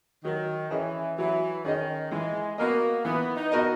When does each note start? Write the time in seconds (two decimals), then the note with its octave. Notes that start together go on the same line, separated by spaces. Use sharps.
0.24 D#3 F#3
0.71 E3 C#4 G#4 D#5
1.18 E3 F#3
1.65 D#3 C#4 G#4 D#5
2.11 E3 G#3
2.58 A#3 B3 F#4 A#4 D#5
3.05 E3 B3
3.36 D#4
3.52 B3 F#4 A#4 D#5